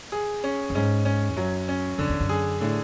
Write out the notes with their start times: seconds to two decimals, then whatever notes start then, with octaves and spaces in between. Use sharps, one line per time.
0.12 G#4
0.44 C#4
0.70 F#2
0.75 G#2 C#4
1.05 C#4
1.29 E2
1.36 F#2 F#3
1.68 C#4
1.98 F#2 D3
2.09 E2
2.21 F#2
2.29 G#4
2.60 A2 D3